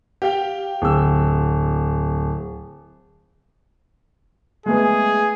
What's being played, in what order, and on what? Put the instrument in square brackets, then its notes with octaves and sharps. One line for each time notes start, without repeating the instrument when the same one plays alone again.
[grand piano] G4 F5 G5
D1 E6
[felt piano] G#3 A3 B3 [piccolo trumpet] G#4